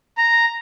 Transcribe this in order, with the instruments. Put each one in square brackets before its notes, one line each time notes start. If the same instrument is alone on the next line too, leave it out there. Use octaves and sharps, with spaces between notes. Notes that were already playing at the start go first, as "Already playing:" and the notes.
[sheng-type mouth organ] A#5